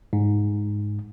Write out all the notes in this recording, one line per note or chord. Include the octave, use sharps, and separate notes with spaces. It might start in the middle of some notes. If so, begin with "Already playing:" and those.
G#2